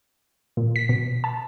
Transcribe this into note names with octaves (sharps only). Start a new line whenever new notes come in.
A#2
B6
B2
A5